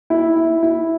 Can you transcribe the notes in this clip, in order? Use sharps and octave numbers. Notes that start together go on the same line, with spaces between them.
E4
E4
E4